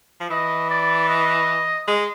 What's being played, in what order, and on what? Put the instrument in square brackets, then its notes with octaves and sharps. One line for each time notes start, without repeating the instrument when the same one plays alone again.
[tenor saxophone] F3
[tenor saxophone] E3 [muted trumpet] D#5
[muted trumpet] D5
D#5
[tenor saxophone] G#3